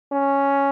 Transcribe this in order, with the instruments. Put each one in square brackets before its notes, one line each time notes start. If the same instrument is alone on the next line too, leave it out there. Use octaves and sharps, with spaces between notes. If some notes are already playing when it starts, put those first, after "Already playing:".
[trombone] C#4